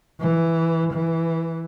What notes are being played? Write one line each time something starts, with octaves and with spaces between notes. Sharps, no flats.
E3
E3